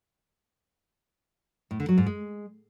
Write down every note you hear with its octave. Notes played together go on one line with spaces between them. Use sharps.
A2
D3
F#3
G#2
G#3